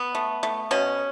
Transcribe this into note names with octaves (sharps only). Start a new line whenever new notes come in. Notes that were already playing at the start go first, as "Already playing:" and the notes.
Already playing: B3
A3
A3
B2 C#4